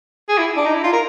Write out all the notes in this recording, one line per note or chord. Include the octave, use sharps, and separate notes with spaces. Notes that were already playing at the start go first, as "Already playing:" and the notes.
G#4
E4
D4
D#4
E4
F4
A#4